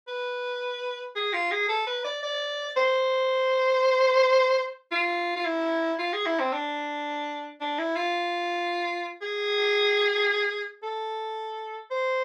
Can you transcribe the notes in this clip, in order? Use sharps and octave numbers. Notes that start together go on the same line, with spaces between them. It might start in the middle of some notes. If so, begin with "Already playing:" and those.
B4
G#4
F4
G#4
A4
B4
D5
D5
C5
F4
F4
E4
F4
G#4
E4
C4
D4
D4
E4
F4
G#4
A4
C5